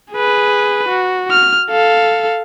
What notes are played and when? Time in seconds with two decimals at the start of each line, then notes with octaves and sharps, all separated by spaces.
0.13 G#4 B4
0.89 F#4
1.31 F6
1.70 A4 F5